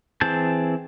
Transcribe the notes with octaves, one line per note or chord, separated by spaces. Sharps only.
E3 C4 G#4 A5 G6